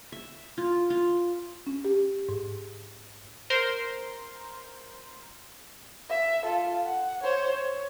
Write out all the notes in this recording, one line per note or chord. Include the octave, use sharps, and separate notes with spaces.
E5
F4
F4
C#4
G4
G#2
A#4 C5 C6
E5
F4 A4
F#5
C5 C#5
C#5